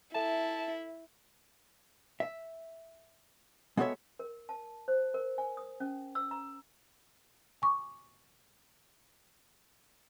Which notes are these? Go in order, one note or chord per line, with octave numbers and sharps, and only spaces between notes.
E4 A4 E5 A5
E5
G#3 B3 F#4 A4 C#5 E5
A#4
A5
C5
A#4
G#5
D#6
C#4
E6
A#5
G#5 C#6 D6